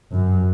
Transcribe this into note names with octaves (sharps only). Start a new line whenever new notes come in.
F#2